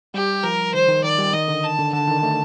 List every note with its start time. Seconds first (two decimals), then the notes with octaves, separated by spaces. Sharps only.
0.14 G3 G4
0.43 F3 A#4
0.74 D#3 C5
0.89 D#3
1.03 D#3 D5
1.18 G3
1.33 D#3 D#5
1.48 D3
1.63 A5
1.78 D3
1.93 D3 A5
2.08 D#3
2.23 A3